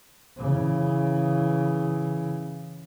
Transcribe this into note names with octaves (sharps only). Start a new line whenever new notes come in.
C#3 E3